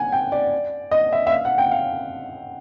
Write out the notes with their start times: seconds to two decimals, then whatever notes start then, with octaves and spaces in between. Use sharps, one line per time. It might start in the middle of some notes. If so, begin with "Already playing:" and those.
Already playing: F#5 G#5
0.12 G5
0.32 D5
0.91 D#5
1.13 E5
1.27 E5
1.31 F5
1.45 F#5
1.58 G5
1.71 F5